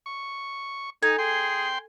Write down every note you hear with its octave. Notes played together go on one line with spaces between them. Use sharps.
C#6
D#4 A4 G#5
G#4 G5 C6